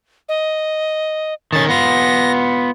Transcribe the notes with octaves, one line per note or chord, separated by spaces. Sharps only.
D#5
D#3 C#4 A6
B3 F4 A#6